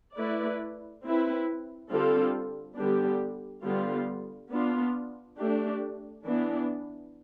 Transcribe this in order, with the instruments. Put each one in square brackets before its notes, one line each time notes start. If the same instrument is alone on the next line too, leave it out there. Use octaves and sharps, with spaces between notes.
[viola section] A3 E4 B4 D5
C4 E4 B4
D3 G3 C4 F4 A4
D3 G3 B3 D4 G4
D3 G3 B3 F4
B3 D4 F4
A3 D4 G4
E3 B3 D4